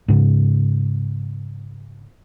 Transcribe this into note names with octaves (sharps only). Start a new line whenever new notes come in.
G#2 C#3